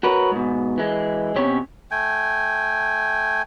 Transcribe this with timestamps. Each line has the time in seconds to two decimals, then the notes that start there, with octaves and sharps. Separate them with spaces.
0.03 F#4 A#4 B4 C#5
0.32 G#2 B2
0.78 E3 G#3
1.36 B2 C4 C#4 G4 C#5
1.91 A3 G5 G#5